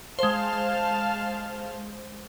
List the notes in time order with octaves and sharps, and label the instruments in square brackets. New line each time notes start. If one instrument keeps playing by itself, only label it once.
[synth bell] G#3 C5 [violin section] F5 A5 F6